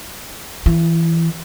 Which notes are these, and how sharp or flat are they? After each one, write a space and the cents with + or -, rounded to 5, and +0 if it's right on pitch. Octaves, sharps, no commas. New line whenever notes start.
E3 +0 E4 +35